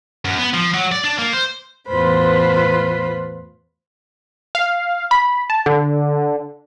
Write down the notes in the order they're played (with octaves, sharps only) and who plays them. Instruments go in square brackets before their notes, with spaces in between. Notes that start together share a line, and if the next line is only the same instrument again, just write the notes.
[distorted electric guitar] F#2
B3
F3
F#3
D5
D4
A#3
C5
[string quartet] E2 A2 F4 B4 C5 B5
[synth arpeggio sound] F5
B5
A5
D3